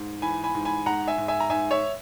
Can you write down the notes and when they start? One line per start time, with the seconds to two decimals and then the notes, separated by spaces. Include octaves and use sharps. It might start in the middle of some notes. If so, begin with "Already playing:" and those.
Already playing: G#2
0.22 E3 G#5 B5
0.44 G#5 B5
0.55 G#2
0.65 G#5 B5
0.86 G#2 F#5 A#5
1.08 E5 G#5
1.18 G#2
1.28 E5 G#5
1.40 A#5
1.50 G#2 E5 G#5
1.71 C#5 E5